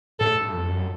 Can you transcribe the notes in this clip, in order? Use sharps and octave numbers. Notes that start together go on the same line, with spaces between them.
A2 A4
G2
F2
F#2